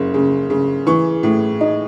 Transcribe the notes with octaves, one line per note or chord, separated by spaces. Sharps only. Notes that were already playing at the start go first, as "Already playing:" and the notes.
Already playing: F#1 C#3
C#3
C#3
E3 C#6
A2
D#4